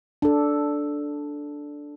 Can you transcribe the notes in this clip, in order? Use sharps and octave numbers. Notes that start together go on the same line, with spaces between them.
D4 A4